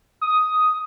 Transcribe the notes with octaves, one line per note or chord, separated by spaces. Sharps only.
D#6